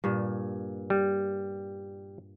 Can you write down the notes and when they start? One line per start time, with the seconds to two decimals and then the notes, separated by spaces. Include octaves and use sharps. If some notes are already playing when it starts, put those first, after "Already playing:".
0.04 G2 A#2
0.90 G3